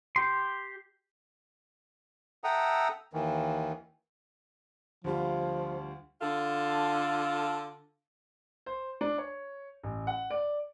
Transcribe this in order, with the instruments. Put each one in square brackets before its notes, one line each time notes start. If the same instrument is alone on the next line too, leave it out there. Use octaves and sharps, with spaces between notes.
[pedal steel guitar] G4 C6
[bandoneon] A4 E5 F#5 G5 A#5 D#6
D#2 D#3 E3
[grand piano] D2 G3 F4 [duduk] F3
[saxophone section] D3 F4 A4
[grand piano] C5
D4
C#5
A1
F#5
D5